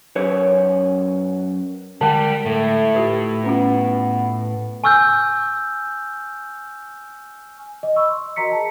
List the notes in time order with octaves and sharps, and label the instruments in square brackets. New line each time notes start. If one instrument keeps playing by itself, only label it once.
[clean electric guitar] F#2 B4 C#5
[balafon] D3 G#3 [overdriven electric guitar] G3 G4
[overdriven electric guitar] A2 [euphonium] A3
[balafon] F4 G4 B4
[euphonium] B3 [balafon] C#4 F4
[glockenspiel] G#5 C#6 E6 F6 G6
[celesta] D#5
B5 C#6 E6
C6
D#5
F#4 A#4 D#5 A#5 B6 C#7
G#4 A5